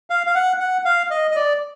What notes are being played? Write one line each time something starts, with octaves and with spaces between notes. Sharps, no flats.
F5
F5
F#5
F#5
F5
D#5
D#5
D5